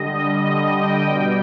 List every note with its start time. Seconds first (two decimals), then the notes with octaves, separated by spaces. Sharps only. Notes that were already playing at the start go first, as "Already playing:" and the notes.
Already playing: D3 G3 D#5
0.44 D3 G3 D#5
0.76 G5
1.08 B2 G3